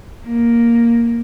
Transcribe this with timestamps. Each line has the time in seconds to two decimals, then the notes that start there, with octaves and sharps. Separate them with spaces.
0.23 A#3